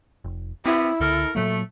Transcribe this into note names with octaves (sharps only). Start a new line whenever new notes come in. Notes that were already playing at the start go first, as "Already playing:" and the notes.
F1
C3 B3 C4 E4
C#2 D3 A4 A#4
A#2 F#3 A3 A#3